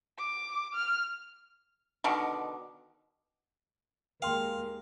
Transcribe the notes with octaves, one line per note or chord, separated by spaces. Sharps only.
D6
F6
B2 D3 D#3
D#2 G#3 A#4 F5 G5 A5 C6